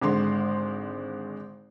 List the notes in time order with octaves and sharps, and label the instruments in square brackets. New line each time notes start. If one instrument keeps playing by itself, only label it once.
[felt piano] G#1 D3 G#3 C6